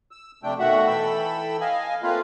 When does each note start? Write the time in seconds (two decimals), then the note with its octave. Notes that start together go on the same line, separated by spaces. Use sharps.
0.11 E6
0.43 F2 C3 A3 D4 G5
0.59 B2 D#3 A3 F#4 E5 F#5
0.87 E3 A4 G5 B5 E6
1.61 D#5 F5 G#5
2.03 A3 A#3 C4 F4 B4 F5